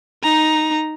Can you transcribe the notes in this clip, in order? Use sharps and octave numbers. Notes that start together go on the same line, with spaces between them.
D#4 A#5